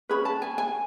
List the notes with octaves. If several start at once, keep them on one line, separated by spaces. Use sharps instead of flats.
C#4 G#4 B4 B5
A5
G#5
G#5